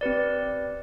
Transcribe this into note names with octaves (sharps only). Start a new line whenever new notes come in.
C4 G4 B4 D5